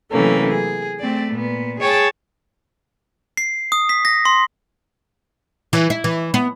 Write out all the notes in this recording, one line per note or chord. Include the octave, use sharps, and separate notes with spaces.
C3 E3 F#3 A3 A#3 C#4
G#4
A3 C4 D5
A#2 B3
G#4 C#5 G5 A5
C7
D#6
B6
A#6
C6
E3
E4
E3
B3